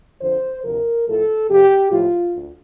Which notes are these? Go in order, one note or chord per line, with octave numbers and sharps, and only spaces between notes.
F2 D3 F3 C5
D2 C3 F3 A#4
A2 F3 A4
F2 C3 F3 G4
A2 F3 F4
D2